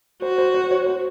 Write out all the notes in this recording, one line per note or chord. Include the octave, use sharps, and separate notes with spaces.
F#4 C5
C5
C5
C#5
C5